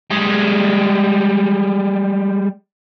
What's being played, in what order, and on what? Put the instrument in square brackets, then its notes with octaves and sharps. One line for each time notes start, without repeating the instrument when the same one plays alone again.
[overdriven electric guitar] G3 G#3